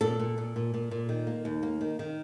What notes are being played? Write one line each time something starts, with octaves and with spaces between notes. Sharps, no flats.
A#2 A4
A#2
A#2
A#2
A#2
A#2
D#3
A#3
D#2
A#3
D#3
D#3